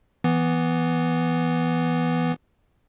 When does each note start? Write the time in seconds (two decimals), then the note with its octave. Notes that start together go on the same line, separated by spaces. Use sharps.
0.24 E3 B3